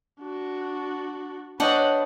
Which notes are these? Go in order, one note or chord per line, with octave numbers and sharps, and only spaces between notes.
D4 F#4
D4 B4 C#5 D#5 F#5 G5 A5